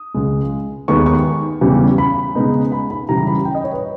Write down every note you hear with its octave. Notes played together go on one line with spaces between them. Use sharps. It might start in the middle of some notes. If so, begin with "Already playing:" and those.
Already playing: D#6
C#2 C#3 G#3
D#2 D#3 G#3 B3 D#4 C#6
C#6
E2 C#3 G3
B5
C#3 G#3 B3 D#4
B5
B5
C#3 E3 G3 C#4 A#5
B5
G5
D#5
C#5
B4